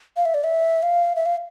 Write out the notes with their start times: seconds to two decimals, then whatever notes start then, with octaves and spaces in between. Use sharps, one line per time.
0.17 F5
0.25 E5
0.34 D5
0.44 E5
0.83 F5
1.16 E5
1.26 F5